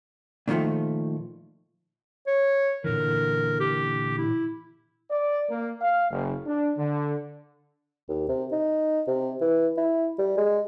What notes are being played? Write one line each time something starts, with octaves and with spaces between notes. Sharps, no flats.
A#2 D3 D#3 F3 A3
C#5
A#2 D3 E3 A#4
G4
E4
D5
A#3
F5
F#1
D4
D3
D#2
C3
D#4
C3
E3
E4
G3
G#3